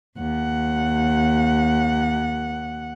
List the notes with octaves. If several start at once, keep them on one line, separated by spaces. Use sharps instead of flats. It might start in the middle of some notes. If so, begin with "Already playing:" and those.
D#2 F#5